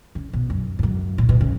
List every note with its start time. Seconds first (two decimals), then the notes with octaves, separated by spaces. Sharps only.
0.15 C#3
0.33 B2
0.50 F#2
0.79 G#2
0.83 F#2
1.18 A#2
1.29 B2
1.41 C#3